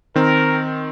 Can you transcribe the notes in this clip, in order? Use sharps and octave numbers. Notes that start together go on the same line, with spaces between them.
D#3 C4 A#4